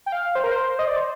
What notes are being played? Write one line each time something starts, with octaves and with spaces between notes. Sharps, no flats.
G5
F5
C5
A#4
C5
D#5
D5
C5